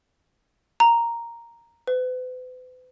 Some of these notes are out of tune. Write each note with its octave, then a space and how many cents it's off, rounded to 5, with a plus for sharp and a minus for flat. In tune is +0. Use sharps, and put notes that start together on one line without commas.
A#5 +0
B4 +45